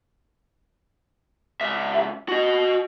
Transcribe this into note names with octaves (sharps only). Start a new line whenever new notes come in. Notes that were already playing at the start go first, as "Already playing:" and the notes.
C#2 E5
F#4 D#5